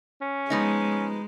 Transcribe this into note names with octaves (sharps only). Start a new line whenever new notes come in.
C#4
F3 G#3 B3 D#4